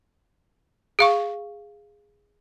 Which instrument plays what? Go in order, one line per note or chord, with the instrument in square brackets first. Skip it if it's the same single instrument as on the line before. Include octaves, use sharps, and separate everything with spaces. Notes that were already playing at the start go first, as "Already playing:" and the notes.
[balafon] G#4 F5 C#6